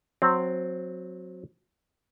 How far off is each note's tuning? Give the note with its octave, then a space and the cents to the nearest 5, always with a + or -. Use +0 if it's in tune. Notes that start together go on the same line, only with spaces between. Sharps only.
F#3 -15 C4 +0